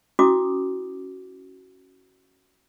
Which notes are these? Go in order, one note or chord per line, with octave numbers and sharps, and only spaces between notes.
C#4 E4 F#4 D6 D#6